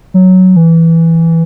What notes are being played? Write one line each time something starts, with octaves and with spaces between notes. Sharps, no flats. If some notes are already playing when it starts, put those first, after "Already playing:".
F#3
E3